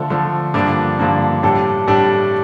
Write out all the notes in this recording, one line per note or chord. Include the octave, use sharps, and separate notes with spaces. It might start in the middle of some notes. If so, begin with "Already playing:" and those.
Already playing: D3 F3 A3
D3 F3 A3
G2 D3 F3 A#3 D4
G2 D3 F3 A#3 D4
A2 G3 D4 A4
A2 G3 D4 A4